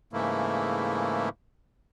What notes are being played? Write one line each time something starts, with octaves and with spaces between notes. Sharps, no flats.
G#2 C#3 E3 A3 A#3 E4